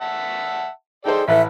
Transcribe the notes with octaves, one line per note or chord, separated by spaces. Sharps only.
E5 F#5 A5
D#4 G#4 A4 C5 D5 G5
A1 A3 B4 E5 A5